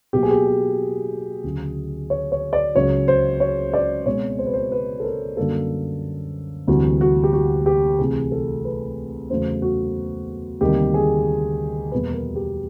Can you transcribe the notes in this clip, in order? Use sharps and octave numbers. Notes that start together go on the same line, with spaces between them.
B2 F#3 A#3 G4
G#4
G4
G#4
D2 C#3 F#3
C#5
C#5
D5
C#2 C#3 F#3 C#5
C5
C#5
D5
B2 G#3 C4 C#5
C5
B4
C5
B4
A4
A#4
F#2 D3 G3 A#3 A4
D2 C3 E3 G3 F#4
F#4
G4
F#4
G4
C2 C3 E3 A3 G#4
A4
B4
E2 C#3 F#3 A3 C5
F#4
D2 C3 D#3 G3 A#3 G4
G#4
E2 B2 G3 A#3 B4
A#4
G4